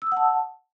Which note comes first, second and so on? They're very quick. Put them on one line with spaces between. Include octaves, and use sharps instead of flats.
E6 D#6 F#5 A5